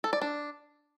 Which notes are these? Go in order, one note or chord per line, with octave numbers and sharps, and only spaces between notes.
A4
D5
D4